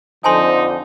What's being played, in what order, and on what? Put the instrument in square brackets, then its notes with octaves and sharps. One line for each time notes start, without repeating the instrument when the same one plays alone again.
[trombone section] F2 D3 F3 [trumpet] D#4 [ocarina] C5 [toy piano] G#5 A5 C6